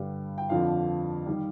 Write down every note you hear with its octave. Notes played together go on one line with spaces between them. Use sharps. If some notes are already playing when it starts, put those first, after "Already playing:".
Already playing: G2 D3 G3
G5
F2 D3 F3 F5
D#3 G3